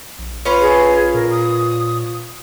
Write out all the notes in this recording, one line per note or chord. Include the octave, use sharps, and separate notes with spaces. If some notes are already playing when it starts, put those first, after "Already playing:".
A#1
C#4 F4 B4
G#4
A#2 A#4
D#6